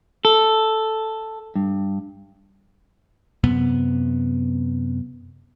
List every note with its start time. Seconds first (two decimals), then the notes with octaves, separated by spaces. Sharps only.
0.25 A4
1.56 G2
3.44 F#2 C3 B3